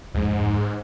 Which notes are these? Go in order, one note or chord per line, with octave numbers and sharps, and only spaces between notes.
D1 F2 G#2 G#3